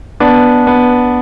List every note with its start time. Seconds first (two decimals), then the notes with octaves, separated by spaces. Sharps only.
0.20 B3 D4
0.67 B3